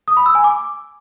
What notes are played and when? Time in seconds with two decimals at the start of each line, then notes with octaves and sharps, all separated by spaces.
0.08 D#6
0.17 B5
0.26 E6
0.35 G#5
0.44 D6